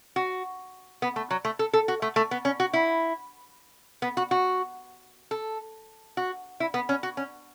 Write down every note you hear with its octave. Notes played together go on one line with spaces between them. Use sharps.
F#4
B3
A3
F#3
A3
A4
A4
F#4
A3
A3
B3
C#4
F#4
E4
B3
F#4
F#4
A4
F#4
E4
B3
C#4
F#4
C#4